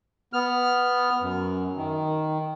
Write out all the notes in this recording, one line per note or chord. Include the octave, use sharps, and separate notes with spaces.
B3 F6
F#2
D#3